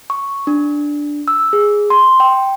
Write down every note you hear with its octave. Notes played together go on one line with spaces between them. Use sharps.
C#6
D4
E6
G#4
C6
G5